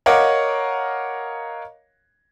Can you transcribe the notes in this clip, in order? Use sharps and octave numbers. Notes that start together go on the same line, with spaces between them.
A#4 C#5 D#5 F5 F#5 D6